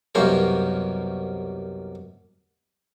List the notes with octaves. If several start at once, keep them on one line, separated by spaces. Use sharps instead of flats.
C2 F#2 B2 A#3 C5 C#5